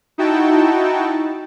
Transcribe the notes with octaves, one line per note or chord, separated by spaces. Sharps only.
D#4 E4 F#4 G5 A5